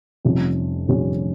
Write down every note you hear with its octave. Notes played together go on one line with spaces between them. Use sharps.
F1 F2 C3 G3 C#4
F1 F2 C3 G3 C#4